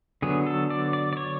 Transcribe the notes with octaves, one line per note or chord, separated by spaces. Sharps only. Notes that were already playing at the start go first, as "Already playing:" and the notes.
D3 F#3 B3 G#4
A4
D5
D5
D5
C#5